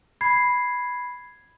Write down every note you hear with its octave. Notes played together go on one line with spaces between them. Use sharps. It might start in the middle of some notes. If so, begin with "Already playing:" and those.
B5 G#6 C7